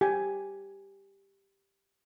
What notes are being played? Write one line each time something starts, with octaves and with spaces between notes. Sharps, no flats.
G4 G#5